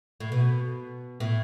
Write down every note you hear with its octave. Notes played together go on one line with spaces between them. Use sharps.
A2
B2
A2